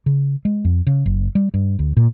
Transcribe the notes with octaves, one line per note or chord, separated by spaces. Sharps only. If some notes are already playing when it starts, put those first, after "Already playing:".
C#3
G#3
F2
C#3
F#1
G3
G2
D2
A#2